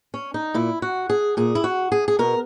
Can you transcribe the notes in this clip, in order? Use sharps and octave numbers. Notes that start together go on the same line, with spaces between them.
C#4
D#4
A#2 E4
F#4
G#4
A#2 G#4
E4
F#4
G#4
G#4
B2 A#4